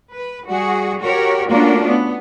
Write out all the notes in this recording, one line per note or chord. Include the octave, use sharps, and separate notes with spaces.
B4
G3 F#4 G#4
F#4 G4 A#4 C#5
A3 A#3 C#4 D4 F4 F#4
B3